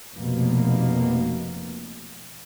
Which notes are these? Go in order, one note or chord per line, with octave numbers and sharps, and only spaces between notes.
F1 B2 A#3